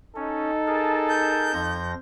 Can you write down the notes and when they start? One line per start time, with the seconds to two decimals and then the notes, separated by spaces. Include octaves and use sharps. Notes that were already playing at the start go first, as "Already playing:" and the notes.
0.16 C#4 D#4 A4
0.67 G#4 A#4 A5
1.08 G6
1.53 F2 F3 A#6